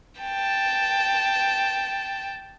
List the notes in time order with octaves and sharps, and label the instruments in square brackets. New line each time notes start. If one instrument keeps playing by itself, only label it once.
[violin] G5 A5